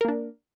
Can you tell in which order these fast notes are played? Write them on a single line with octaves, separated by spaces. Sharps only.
A#4 A#3 D4